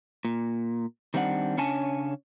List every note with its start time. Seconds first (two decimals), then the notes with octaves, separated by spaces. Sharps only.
0.25 A#2
1.14 D#3 G3 C4 D4 F#5
1.57 C#3 C#4 D4 C#5 G#5 A5